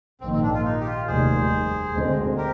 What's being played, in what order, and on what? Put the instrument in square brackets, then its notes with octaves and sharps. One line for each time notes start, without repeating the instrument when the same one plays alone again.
[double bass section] A#1 G#2 D#3 A#3 [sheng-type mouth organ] C4
[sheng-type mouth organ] C4
D4
F4
D#4
G4
F4
[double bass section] F1 D#2 D#3 G3 [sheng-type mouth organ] G#4 C5
[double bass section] D2 D3 G#3 C4
[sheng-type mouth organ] G4 A#4